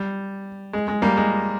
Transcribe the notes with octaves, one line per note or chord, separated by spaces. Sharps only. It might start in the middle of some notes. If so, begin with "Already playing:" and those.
Already playing: G3
G#3
G#3
G3 A#3
G#3